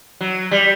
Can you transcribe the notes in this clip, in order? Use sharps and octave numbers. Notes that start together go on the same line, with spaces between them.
F#3
G3